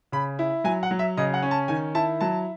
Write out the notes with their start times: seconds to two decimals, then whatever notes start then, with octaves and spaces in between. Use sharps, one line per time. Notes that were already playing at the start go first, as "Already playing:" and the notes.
0.12 C#3 B5
0.39 E4
0.64 F#3 G#5
0.83 F#5
0.91 F#3
0.99 E5
1.17 C#3 D#5
1.34 F#5
1.42 C#4
1.51 A5
1.68 D#3 G#5
1.95 E4 A5
2.21 F#3 A5